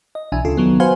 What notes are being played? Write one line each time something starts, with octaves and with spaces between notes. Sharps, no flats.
D#5
B1 E3 D4 E5 G#5
D2 C#3 F4 A4
D#3 F#3 B3
F#4 B4 C5 F5 G#5